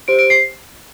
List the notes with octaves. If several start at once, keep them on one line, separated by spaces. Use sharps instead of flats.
G4 C5 D7
D7
C7